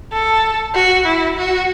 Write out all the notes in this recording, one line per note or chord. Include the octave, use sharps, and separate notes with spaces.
A4
F#4
E4
F#4